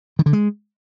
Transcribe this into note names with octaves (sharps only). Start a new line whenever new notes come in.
D#3
D3
G#3